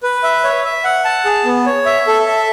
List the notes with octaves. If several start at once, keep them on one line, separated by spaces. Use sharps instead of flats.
B4
E5
C#5
E5
F#5
A5
G#4
B3
C#5
E5
A4
E5